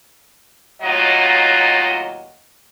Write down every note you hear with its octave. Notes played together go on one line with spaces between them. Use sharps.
D#2 A2 F#3 F4 D#5